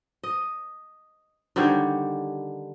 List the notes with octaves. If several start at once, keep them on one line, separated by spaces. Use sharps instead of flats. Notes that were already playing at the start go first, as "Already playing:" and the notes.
D#5
D3 D#3 G3 C#5